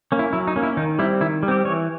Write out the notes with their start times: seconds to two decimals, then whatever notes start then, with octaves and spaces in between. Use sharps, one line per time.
0.12 A#3 C#4
0.19 E4
0.33 F#3 E4
0.47 D#4
0.56 A#3 C#4
0.63 E4
0.77 D#3 D#4
0.99 G3 C4 E4
1.21 D#3 E4
1.43 G3
1.48 C4 G4
1.65 E3 C#5